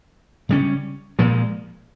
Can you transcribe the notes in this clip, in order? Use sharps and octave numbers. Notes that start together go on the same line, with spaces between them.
C#3 G3 C#4
A#2 F3 G#3